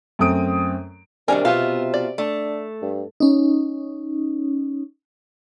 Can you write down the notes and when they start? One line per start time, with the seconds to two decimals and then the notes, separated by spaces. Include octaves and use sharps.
0.19 F#2 A3 C4 D#6 D7
1.28 C3 D#3 G3 C#4 D4 A#4 G#5
1.45 B2 B3 F4 G4 E5 F5
1.94 D5
2.18 A3 D4
2.82 G2
3.20 C#4 D#4